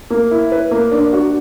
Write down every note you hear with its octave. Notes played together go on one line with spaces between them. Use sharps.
A#3
E4
B4
A#3
D4
F#4